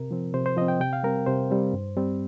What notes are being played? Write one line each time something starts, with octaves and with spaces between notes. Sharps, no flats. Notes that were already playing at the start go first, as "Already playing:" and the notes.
Already playing: C3 A#4
F3 C4
C3 C5
C5
F3 C4 D#5
G5
C3 G5
F5
G3 C4 A#4
C3 C5
G3 C4
G2
G3 C4